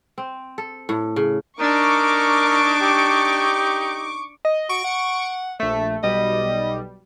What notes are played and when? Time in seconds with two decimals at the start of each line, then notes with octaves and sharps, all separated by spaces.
0.18 C4
0.58 A4
0.89 A2
1.16 C#3
1.60 D4 D#4 A#4 C#6 D6
2.81 G4
4.45 D#5
4.69 F#4 C#6 D7
4.84 F#5
5.60 A#1 A3 E5
6.03 B1 B2 G3 D#5